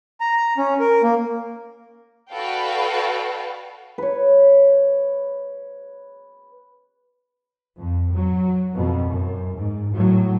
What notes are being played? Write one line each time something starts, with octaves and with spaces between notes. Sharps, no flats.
A#5
C#4
A#4
A#3
F#4 A4 B4 D5 F5 G5
B4 C#5
F2
F#3
F2 B2
F#2
G#2
A2 F#3